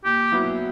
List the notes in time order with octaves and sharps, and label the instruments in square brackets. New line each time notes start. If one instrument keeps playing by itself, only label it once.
[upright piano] A#2 [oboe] G4
[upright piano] F#3 B3 E4